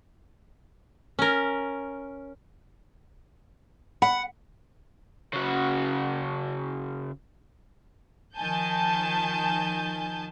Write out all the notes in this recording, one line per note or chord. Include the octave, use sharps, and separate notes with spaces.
C#4 A#4
F#5 B5
C#3 F#4
D#3 F3 G#5 A5 G6